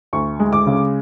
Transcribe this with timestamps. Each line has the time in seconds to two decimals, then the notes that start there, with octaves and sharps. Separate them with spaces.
0.13 D2 C#6
0.40 G#3
0.53 D6
0.66 C#3